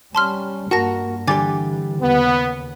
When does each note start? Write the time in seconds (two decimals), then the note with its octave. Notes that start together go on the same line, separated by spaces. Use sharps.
0.15 G3 C#4 A5 C6 F6
0.71 G2 A#3 F#4 A#4 F#5 A5 A#6
1.28 D3 E3 G3 G4 G#5 D6 A6
2.01 D#2 C#3 B3